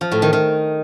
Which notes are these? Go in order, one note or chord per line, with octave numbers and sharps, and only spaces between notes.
F3
A2
D#3
D#3